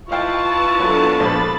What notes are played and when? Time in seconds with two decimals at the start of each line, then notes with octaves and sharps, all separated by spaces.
0.11 E4 F4 B4 D#5 F5 G5 A5 C#6
0.80 F#3 B3 D4 A4
1.20 A#1 C5 B5 A6